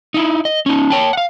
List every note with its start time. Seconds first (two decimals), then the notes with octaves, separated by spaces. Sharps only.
0.14 D#4 E4
0.45 D#5
0.66 C#4 D#4
0.90 C#5 G5 A5
1.13 F5 F#5